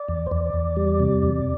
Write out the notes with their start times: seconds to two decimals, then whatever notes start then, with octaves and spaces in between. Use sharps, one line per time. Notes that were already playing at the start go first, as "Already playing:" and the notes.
Already playing: D5
0.08 E2
0.26 C5
0.31 E2 D5
0.54 E2
0.76 G3
1.00 C3
1.23 E2